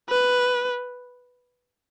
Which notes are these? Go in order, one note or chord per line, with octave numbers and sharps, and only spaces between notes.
B4